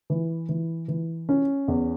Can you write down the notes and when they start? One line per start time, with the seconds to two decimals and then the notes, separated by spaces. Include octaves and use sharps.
0.10 E3
0.49 E3
0.88 E3
1.29 C#4
1.68 E2